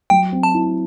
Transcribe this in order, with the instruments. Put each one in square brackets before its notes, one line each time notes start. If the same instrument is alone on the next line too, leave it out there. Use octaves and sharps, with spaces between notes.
[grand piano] F#3 [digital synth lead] G5
[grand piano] C4
[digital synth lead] A5
[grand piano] E4